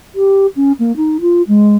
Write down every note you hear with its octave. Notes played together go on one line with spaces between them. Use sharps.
G4
C#4
A#3
D#4
F4
G#3